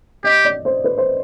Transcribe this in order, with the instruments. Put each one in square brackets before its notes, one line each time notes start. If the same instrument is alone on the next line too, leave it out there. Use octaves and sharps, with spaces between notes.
[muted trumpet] G4 [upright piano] D#5
[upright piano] D5
C5
B4
C5